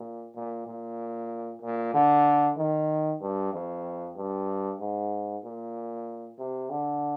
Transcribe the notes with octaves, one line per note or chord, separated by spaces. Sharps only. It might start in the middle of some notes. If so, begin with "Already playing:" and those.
Already playing: A#2
A#2
A#2
A#2
D3
D#3
G2
F2
G2
G#2
A#2
C3
D3